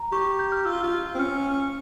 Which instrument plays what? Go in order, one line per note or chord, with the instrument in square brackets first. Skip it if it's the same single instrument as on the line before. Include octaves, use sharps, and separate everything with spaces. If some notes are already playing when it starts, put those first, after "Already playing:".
Already playing: [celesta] A#5
[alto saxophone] G4 [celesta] C#6
[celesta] G6
F6
[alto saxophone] F4 [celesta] E6
[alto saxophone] F4
C4
[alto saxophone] C#4 [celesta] F6